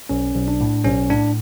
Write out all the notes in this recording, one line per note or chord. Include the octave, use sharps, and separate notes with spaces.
B1 C#4
B1
D4
A2
B1 C#4
A2 D4